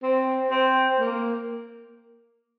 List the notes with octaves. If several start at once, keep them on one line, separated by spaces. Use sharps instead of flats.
C4
C4
A#3